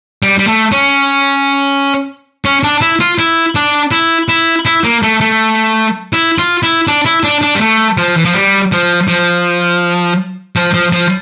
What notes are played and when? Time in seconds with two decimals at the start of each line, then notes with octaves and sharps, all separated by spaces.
0.23 G3
0.39 G3
0.47 A3
0.72 C#4
2.45 C#4
2.63 D4
2.81 E4
3.00 F4
3.19 E4
3.55 D4
3.91 E4
4.29 E4
4.66 E4
4.84 A#3
5.03 A3
5.21 A3
6.13 E4
6.39 F4
6.63 E4
6.87 D4
7.05 E4
7.24 D4
7.42 D4
7.55 G3
7.61 A3
7.97 F3
8.17 E3
8.25 F3
8.34 G3
8.72 F3
9.08 F3
10.56 F3
10.74 F3
10.93 F3